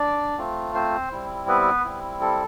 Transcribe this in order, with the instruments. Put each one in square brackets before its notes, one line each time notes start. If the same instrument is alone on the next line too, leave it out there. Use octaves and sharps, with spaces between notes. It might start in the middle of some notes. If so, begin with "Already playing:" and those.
Already playing: [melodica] D4 D5
A3 C4 F4
C4 C5
G3 C4 E4
B3 B4
G3 C4 E4
A4